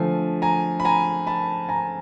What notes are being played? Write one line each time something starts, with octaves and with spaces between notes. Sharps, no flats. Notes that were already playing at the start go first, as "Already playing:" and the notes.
Already playing: D3 F3 A3 G#5
G#5 A#5
B5
G#5 A#5
A5 B5
G#5 A#5